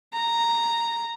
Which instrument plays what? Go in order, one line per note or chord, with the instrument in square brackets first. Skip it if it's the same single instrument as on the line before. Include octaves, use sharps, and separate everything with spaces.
[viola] A#5